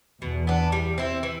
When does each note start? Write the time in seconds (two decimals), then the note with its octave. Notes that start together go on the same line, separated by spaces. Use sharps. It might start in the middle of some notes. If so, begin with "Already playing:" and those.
0.22 E2 B2
0.47 B3 D4
0.72 G3
0.98 C4 E4
1.23 E3